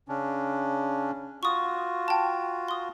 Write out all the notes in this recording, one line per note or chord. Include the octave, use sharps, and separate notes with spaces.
C#3 C#4 D4
F4 F#4 C#6 D#6
G5 A5
C6 D#6